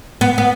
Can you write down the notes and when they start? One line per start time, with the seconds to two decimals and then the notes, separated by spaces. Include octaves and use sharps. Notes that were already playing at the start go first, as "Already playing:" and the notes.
0.21 B3
0.38 B3